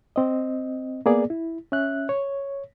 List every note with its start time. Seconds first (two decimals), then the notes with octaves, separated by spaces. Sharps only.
0.16 C4 D#5
1.06 A#3 B3 G#4 D5
1.30 E4
1.72 C#4 E5 F#6
2.09 C#5